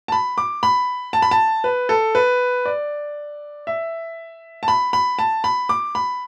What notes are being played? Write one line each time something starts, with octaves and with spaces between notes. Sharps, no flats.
A5
B5
D6
B5
A5
B5
A5
B4
A4
B4
D5
E5
A5
B5
B5
A5
B5
D6
B5